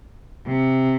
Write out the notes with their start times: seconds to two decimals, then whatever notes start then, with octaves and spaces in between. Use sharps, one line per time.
0.46 C3